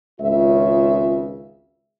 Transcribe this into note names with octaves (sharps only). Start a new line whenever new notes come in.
G#1 C#2 C#3 F4 E5